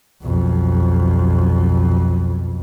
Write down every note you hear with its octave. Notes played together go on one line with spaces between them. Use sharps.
B1 F2